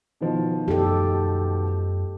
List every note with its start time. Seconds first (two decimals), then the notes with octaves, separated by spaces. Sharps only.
0.21 B2 D#3 F3
0.68 F#2 G4 A4